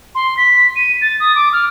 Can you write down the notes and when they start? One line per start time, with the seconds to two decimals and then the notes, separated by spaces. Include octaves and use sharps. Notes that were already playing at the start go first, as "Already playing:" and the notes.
0.15 C6
0.37 B6
0.76 D#7
1.01 A6
1.20 D#6
1.35 D6
1.53 F6